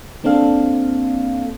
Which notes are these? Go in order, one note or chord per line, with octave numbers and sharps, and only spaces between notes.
A#3 C4 D4 A4 F5